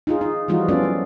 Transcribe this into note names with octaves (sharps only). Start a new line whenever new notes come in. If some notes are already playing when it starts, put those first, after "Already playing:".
D#4 F4 G#4
D#4
E3 F3 G3 D#4 F4 F#4
F3 B3 C#4 F4 A4 D5
F#3